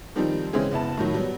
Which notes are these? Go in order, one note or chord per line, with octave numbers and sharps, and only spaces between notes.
D#3 F3 G3 C4 D#4
C#3 E3 G#3 C4 C#4 G#4
F#1 B3 E4 A5
A2 D#3 F#3
F#3 G3 B3